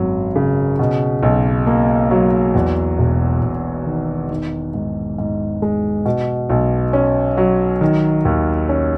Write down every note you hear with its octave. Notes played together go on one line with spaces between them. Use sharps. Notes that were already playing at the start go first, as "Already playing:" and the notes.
Already playing: G#1 F#2 F#3
C#3
B2
B1
A#3
F#3
E2
E1
E1
D#3
D#3
G#2
G#2
G#3
B2
B1
C#4
F#3
D#3
D#2
C#4